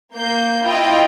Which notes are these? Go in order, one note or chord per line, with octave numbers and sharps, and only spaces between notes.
A#3 G6
E4 F4 D#5 G5